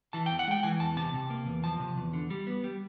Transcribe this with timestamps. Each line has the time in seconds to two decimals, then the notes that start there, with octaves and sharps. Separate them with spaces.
0.13 E3 A5
0.26 E2 G5
0.39 F#5
0.48 G#3 G5
0.63 E3 G#5
0.80 E2 A5
0.96 C3 A5
1.14 C3
1.30 A#3
1.46 E2
1.64 F3 A5
1.80 C3
1.97 E2
2.13 D3
2.30 G3
2.47 B3
2.64 G3